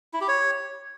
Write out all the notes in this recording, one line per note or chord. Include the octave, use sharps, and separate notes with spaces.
E4
G4
C#5